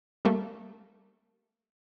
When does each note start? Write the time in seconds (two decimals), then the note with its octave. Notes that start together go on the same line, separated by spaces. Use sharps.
0.25 G3 A3 A#3